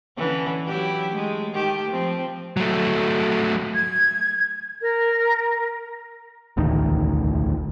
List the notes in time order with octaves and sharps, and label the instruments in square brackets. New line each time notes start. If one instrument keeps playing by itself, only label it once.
[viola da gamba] D3 E3 C#4
F#3 E4 G4
G#3 A3
D#3 A3 G4
F3 C4
[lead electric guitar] F#3 A3
[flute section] G#6
A#4
[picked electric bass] E1 A1 D2 D#3